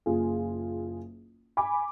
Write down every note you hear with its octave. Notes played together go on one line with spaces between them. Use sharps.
F#1 F4 G#4
G#5 B5 D6